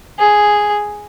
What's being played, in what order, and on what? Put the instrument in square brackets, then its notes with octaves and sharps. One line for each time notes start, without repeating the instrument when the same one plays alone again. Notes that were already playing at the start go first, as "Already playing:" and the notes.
[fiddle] G#4